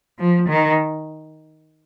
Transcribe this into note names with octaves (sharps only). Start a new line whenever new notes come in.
F3
D#3